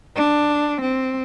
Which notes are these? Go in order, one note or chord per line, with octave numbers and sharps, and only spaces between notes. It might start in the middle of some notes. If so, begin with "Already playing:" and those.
D4
C4